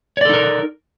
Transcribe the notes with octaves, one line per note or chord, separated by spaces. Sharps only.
D#4 A4 A#4 C#5 D5